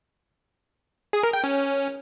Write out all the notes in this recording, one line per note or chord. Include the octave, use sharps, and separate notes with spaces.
G#4
A#4
G5
C#4